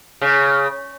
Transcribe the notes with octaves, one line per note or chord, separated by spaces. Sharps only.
C#3